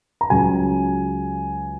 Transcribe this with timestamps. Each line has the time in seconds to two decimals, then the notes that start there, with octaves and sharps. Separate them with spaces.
0.21 A#5
0.30 C#2 C#3 F#3 G#5